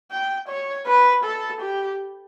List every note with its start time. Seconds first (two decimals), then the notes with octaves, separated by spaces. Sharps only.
0.12 G5
0.48 C#5
0.86 B4
1.24 A4
1.61 G4